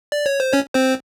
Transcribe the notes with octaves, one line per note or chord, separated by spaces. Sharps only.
D5
C#5
C5
C#4 C#5
C4 C5